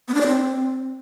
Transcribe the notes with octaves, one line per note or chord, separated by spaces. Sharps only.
B3
D4
D5
C4